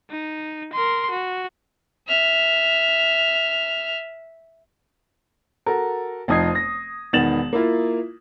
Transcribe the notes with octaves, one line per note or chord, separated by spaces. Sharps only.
D#4
A#4 C6
F#4
E5 F6
F#4 A4 A#4
F1 F2 D#4 D#6 G#6 C7
A#6
E1 D#3 B3 A6 E7 F#7
A#3 E4 F4